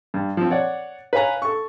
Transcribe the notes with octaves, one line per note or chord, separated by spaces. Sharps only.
G2
F3 C4
C#5 D5 F#5
B4 C#5 F5 G#5 A#5
A4 C#6